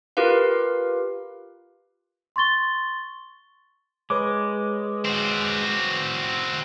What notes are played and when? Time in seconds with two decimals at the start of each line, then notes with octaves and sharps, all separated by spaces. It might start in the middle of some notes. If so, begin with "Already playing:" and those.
0.17 F4 G4 A#4 B4 F5
2.36 C6 C#6 A6 G7
4.10 G#3 B4 C#5 D6
5.05 C4 F#4